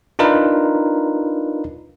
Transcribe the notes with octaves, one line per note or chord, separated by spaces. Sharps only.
D4 D#4 F4 A#4 B4